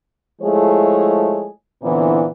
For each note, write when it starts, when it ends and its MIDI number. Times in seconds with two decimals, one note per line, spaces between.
0.42 1.48 53
0.42 1.48 56
0.42 1.48 57
0.42 1.48 64
0.42 1.48 68
0.42 1.48 73
1.83 2.27 46
1.83 2.27 50
1.83 2.27 52
1.83 2.27 59
1.83 2.27 60
1.83 2.27 64